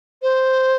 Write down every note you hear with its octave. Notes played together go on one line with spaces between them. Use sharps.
C5